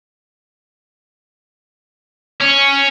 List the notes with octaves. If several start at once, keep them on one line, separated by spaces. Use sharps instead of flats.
C#4